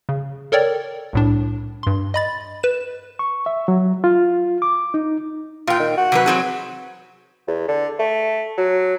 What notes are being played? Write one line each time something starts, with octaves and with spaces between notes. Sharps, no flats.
C#3
A4 A#4 C#5 D5 G5
C2 A2 D4
G2 C6
D#5 B5 A6
B4 E7
C#6
E5
F#3
F4
D6
D#4
A#2 F4 G5
D#3
F#4
C3 F#3 B4
F#3 C4 G#4
E2
D3
A3
F#3